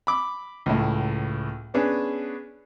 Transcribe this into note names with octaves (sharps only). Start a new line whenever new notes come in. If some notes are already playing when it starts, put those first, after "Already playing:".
B5 D6
C#2 A2
B3 C#4 D4 G#4 B4 C#5